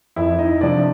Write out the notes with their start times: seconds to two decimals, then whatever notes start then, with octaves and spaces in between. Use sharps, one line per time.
0.16 F2 E4 E5
0.39 D#4 D#5
0.61 C3 F3 D4 D5